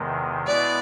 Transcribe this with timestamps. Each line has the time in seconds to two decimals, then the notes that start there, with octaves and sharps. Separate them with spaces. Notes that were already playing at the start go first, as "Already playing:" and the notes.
Already playing: E2 C3 D#3 G#3
0.47 B2 G#3 B3 E4 D5